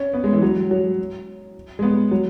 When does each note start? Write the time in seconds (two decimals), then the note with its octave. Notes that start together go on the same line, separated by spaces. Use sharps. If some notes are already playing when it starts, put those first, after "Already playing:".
Already playing: C#4
0.14 B3
0.24 G#3
0.33 E3
0.42 F#3
0.71 F#3
1.79 G#3
1.83 B3
2.11 F#3